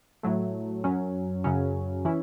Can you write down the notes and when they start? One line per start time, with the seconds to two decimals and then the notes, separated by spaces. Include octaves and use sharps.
0.23 A2 F#3 A3
0.84 F#2 F#3 C#4
1.44 F#2 C#3 F#3 C#4
2.05 E3 C#4 E4